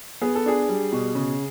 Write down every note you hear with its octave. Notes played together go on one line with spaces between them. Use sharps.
B3 G#4
A4
D4 G#4
G3
B2
C#3